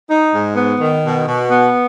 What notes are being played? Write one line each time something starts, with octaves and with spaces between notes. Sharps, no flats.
D#4
G#2
B3
D#3
B2
B2
B3